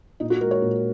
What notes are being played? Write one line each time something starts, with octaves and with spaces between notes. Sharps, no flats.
A#2 D#4
F#4
G#3 A#4
C#5
A#2